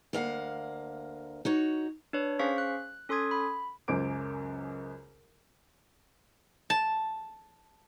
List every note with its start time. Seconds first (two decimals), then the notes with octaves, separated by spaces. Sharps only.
0.13 D2 A#3 F5 F#5
1.45 D#4 F#4 C#5
2.13 D4 B4 C#5
2.39 C#4 G#4 C5 F5 C#6 B6
2.58 F#6
3.09 C#4 A4 C6 D#6 G#6
3.31 B5
3.88 C#2 F#2 C5 D6 D7
6.70 A5